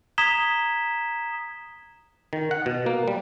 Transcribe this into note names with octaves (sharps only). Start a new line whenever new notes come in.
A#5 D#6 G#6 B6 E7 G7
D#3
F#5
B2
A#3
G3